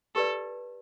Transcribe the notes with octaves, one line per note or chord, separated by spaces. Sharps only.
G4 A4 B4 D5